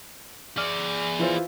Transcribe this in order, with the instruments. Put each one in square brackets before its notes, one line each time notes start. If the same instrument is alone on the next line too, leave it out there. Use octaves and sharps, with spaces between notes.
[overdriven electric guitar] G#4 D5 [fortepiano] F6
[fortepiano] E3 F4 C5